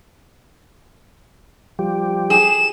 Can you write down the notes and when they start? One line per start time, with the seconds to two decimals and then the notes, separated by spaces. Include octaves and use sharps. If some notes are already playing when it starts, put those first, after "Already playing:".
1.79 F3 G3 G4
2.30 G#4 E7